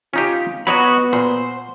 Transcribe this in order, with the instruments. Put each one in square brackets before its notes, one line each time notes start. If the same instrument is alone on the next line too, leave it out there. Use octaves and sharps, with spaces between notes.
[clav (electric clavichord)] C#4 D#4 G4 [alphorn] F4
[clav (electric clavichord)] F#3 C#5 [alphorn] B3 [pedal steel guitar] F#4 D#5 B5
[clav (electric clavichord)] A#2 [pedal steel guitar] C5